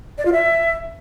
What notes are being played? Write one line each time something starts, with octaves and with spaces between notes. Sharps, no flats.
D5
F4
E5